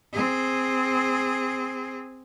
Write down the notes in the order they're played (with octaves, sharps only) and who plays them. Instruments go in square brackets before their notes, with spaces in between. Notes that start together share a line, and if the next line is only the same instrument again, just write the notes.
[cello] C4 G#4